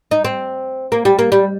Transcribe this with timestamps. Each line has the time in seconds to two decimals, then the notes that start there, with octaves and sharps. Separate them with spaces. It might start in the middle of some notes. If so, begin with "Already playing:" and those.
0.11 D#4
0.24 C4
0.92 A#3
1.05 G3
1.19 A#3
1.32 G3